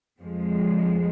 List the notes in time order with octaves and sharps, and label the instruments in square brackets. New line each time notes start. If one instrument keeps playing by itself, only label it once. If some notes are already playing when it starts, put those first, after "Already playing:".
[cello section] F2 F3 G#3